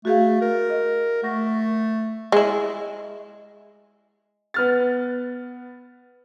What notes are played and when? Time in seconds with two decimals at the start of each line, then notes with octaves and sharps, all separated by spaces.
0.05 A3 F#4 G#4 F5
0.42 A#4
0.70 D#5
1.23 A3 F#5 C#6 A#6
2.32 G#3 E4
4.54 B3 F6 A6